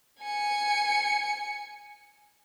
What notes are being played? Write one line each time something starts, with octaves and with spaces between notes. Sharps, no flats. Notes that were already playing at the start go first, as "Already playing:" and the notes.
G#5 C#7